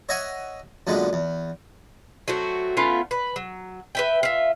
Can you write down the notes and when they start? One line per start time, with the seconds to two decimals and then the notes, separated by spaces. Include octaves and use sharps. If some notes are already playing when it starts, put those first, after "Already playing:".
0.09 C#5 D#5 E5 F#5 G#5 D#6
0.87 F#2 A#2 D3 G#3 B3
1.13 E2
2.28 F#3 A3 C4 F#4
2.77 A3 B3 C#4 F4
3.11 B4
3.36 F#3
3.95 B4 E5 G5
4.23 F4 E5